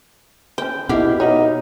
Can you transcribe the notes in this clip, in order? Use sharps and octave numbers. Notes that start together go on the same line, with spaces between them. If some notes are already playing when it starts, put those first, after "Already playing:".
C#4 C5 G5
B2 E4 F#4 G4 F5
B3 D#4 F#4 C#5